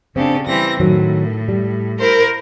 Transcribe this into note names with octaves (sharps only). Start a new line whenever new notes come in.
C#3 C4 D4 G4 A4
E3 G3 C4 A#6
A2 D#3 F#3
G3
E4 A#4 C5